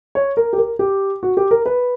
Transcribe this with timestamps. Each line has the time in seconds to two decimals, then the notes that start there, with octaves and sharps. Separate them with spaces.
0.15 C#5
0.37 A#4
0.53 G4
0.58 A#4
0.79 G4
1.23 F#4
1.37 G4
1.51 A#4
1.66 B4